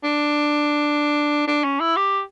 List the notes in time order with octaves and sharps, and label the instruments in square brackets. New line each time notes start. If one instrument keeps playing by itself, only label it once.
[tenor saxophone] D4
D4
C#4
E4
G4